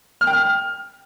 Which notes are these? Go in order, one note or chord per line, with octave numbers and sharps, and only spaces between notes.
F6
G5
F6